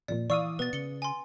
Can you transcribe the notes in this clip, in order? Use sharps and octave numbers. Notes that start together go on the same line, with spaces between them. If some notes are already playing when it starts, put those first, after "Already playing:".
A#1 F2 A#2 D5
E3 D5 F5 C#6 D#6 E6
B2 B3 B4 A6
C#3 C#7 G7
G#5 C6